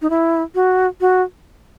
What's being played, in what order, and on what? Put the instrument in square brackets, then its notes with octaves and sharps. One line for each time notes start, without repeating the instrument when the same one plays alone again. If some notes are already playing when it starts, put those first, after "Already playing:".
[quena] D#4
E4
F#4
F#4